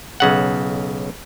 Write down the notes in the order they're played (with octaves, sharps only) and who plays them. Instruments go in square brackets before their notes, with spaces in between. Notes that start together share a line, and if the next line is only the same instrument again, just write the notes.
[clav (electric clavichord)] B1 C#3 F#5